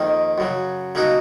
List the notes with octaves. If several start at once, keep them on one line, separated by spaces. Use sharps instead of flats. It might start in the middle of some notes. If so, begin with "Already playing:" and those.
Already playing: F2 D#3 A#3 D#4
F#2 C#3 F#3
C#3 F#3 A#3 D#4 F#4